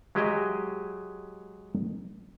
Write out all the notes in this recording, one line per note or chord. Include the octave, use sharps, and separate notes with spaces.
F#3 G#3 G4 G#4 D#5 E5